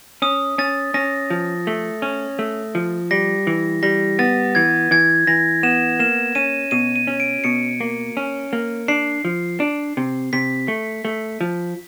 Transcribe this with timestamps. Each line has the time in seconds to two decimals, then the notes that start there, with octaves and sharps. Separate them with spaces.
0.22 C#4 D#6
0.58 C#4 A6
0.94 C#4 A#6
1.30 F3
1.67 A3
2.02 C#4
2.39 A3
2.75 F3
3.11 G3 A#6
3.47 E3
3.83 G3 A#6
4.19 B3 A6
4.55 E3 G#6
4.91 E3 G#6
5.27 E3 A#6
5.63 B3 E7
5.99 A#3 E7
6.35 C#4 D#7
6.71 B2 D#7
6.96 D#7
7.07 C#4
7.20 D7
7.44 B2 C#7
7.80 A#3
8.17 C#4
8.53 A#3
8.88 D4 C7
9.25 F3
9.60 D4
9.97 C3
10.33 C3 B6
10.68 A3
11.05 A3
11.41 F3